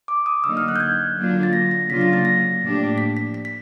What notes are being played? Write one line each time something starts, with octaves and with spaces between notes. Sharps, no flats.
D6
D#6
D3 F#3 A#3 D#4 E6
F6
F#6
G6
G#6
D3 F#3 A#3 D4 F4
A6
A#6
A#6
C#3 F#3 A#3 D4 F4 B6
A#6
A6
A#6
A2 F3 A#3 D4 G4
B6
B6
B6
B6